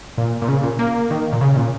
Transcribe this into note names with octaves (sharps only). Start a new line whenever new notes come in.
A#2
A#2
C#3
A#2
A#3
D#3
A#2
C#3
A#2